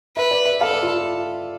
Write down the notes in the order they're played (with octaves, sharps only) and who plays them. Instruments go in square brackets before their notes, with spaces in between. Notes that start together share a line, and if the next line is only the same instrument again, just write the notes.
[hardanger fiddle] B4 [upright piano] E5
[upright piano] D5
E5
[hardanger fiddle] A4 [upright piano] F5
[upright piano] D5
F4